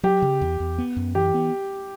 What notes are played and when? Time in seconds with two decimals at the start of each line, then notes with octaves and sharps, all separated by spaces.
0.03 F#3 G4
0.22 C#3
0.41 E2
0.60 E2
0.78 B3
0.97 F#2
1.15 E3 G4
1.34 B3